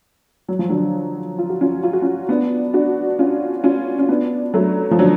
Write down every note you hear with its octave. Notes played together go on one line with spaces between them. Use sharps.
F#3
F3
D3 F#3
F4
F#4
C#4 F4
F4
F#4
C#4 F4
B3 D4
D4 F#4
C#4 F4
C#4 F4
C#4
B3 D4
F#3 A3
F3
D3 F#3